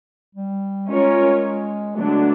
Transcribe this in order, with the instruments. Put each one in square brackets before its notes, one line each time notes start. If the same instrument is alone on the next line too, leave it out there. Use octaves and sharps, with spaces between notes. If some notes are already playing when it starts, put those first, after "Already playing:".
[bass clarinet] G3
[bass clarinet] G#3 [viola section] C#4 F4 A#4 C#5
[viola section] D3 F#3 B3 D4 [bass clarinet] A3